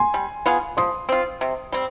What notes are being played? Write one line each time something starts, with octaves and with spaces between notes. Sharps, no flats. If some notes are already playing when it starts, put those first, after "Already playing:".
Already playing: G#5 C6
G3
B3 F4 G#4
F3 C6 D#6
C4 F4
C3
G3 C4